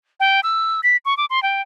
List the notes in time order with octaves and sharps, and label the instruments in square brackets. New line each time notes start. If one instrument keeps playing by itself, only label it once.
[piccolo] G5
E6
B6
C#6
D6
C6
G5